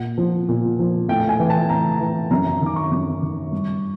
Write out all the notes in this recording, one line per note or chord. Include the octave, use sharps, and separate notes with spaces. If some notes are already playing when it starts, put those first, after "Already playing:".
Already playing: A#2 F#5
F3
A#2
F3
A2 G5
G5
G#5
E3
A5
A2 A#5
E3
F#2 A#5
A#5
D#3
D6
C#6
F#2
D#3
G2